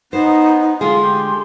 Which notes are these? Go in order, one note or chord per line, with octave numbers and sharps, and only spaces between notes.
B3 D#4 C5
D3 G#3 F4 G#4 C6
G4